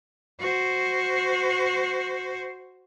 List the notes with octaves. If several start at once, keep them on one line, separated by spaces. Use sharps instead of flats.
F#4 C5